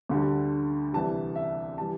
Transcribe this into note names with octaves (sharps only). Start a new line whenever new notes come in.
D2 D3 G3
C2 C3 E3 G3 A5
E5
E3 G3 A5